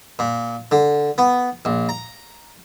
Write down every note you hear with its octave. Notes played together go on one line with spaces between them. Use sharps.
A#2
D3
B3
A#1
A#5